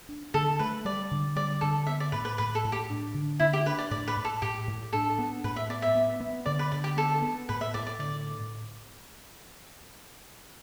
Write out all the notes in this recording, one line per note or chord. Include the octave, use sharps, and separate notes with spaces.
D4
D3 A4
A3 B4
G3 D5
D3
G3 D5
D3 A4
B3 E5
D5
A2 B4
B4
A2 B4
A4
A2
G4
D4
D3
D3 E4
G4
D4 B4
D5
A2 D5
B4
A2
A4
A2 G4
A2
D4 A4
B3
A2 B4
E5
B3 D5
E5
B3
B3
D3 D5
B4
D3 D5
G4
B3 A4
B3
A2 B4
E5
A2 D5
D5
D3 D5